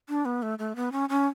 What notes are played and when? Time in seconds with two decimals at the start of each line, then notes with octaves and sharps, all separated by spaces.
0.09 D4
0.25 B3
0.42 A3
0.59 A3
0.76 B3
0.92 C#4
1.09 C#4